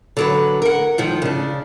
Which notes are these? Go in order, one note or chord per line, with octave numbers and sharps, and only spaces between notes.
D3 F#3 B4
A#4 F#5
G#2 D#3 F3
C#3 D4